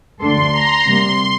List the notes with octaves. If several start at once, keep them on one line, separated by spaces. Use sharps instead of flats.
D2 D3 A3 D4 A4 C6
A#5
C3 G3 A#3 C6